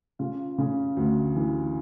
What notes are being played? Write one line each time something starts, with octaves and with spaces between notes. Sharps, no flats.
C#3 F4
C#3
D2
E3